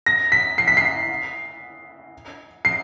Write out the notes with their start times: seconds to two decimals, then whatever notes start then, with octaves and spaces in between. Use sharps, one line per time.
0.06 A#6
0.32 B6
0.58 C7
0.68 B6
0.77 C7
2.65 C7